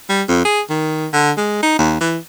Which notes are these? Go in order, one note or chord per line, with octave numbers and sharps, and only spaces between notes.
G3
F2
G#4
D#3
D3
G#3
D#4
D#2
E3